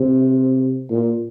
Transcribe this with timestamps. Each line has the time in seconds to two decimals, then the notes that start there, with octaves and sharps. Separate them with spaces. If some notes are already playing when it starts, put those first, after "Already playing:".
Already playing: C3
0.90 A#2